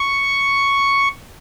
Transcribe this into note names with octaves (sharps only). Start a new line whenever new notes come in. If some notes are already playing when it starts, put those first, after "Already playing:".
Already playing: C#6